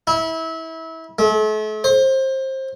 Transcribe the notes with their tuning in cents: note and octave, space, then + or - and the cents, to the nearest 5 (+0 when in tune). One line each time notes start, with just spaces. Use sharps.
E4 -25
A3 -40
C5 +25